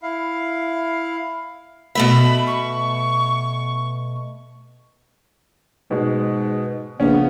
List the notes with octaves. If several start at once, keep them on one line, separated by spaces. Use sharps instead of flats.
E4 F5
B2 A3 E5 B5
C#6
G#2 B2 G#3
A#1 C#3 B3 C#4